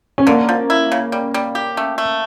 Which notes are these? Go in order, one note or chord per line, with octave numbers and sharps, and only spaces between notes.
C#4
D3 A#3
F3
E4
C#3
G3
G3
G4
A3
A3